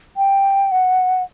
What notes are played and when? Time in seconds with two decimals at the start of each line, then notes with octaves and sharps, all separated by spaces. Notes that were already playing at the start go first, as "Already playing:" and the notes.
0.17 G5
0.71 F#5